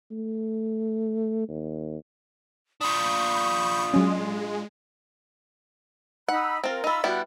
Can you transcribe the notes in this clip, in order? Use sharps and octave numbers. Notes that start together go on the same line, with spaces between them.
A3
D#2
D4 F4 B5 C#6 D#6 G6
F#3 G#3 C#4
D#4 F#5 B5 E6
C4 F4 A#4
D#4 F4 B5 E6
G3 B3 E4 F#4